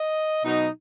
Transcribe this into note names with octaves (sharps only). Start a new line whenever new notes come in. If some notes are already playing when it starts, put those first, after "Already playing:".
Already playing: D#5
B2 F#3 D#4